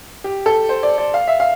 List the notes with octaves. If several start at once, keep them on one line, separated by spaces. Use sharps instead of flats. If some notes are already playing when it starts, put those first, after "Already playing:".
G4
A4
C5
D5
D5
F5
E5
F5